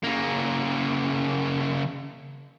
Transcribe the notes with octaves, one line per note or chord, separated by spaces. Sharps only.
C#3 A#3